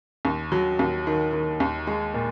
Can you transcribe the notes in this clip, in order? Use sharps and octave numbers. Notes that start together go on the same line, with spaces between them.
D#2
F#3
D#2
D#3
D#3
D#2
G#3
A#2